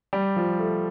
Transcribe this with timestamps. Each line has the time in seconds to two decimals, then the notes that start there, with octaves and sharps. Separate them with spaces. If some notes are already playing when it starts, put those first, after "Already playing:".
0.13 G3
0.36 F3
0.59 A3